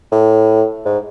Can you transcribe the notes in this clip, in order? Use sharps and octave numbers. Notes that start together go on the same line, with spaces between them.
A2
G#2